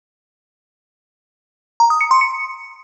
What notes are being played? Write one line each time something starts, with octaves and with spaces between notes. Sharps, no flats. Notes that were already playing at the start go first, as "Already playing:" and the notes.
A#5
D#6
C#7
C6
C#7